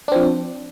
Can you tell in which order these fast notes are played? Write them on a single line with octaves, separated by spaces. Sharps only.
D4 C4 F3